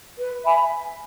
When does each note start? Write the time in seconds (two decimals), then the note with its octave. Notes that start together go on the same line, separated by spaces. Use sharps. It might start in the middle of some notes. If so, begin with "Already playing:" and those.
0.17 B4
0.44 E5 G#5 B5